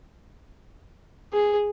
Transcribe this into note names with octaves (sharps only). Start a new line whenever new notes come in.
G#4